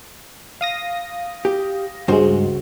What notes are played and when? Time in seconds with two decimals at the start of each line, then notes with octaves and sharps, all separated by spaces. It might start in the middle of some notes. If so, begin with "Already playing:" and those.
0.61 F5 D#6 A#6
1.45 G4
2.08 C#2 G2 G#3 F#4 C5